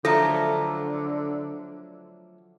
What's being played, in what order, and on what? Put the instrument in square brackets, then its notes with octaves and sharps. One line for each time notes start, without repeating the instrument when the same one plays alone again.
[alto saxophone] D3 [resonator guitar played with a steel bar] F3 F#3 A3 [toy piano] A4 [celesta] A#5 A#6